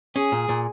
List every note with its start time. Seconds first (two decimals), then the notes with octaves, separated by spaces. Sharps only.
0.16 C#4 G#4
0.32 A#2
0.49 A#2